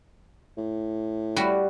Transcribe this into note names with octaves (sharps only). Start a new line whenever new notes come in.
A2
G3 F#4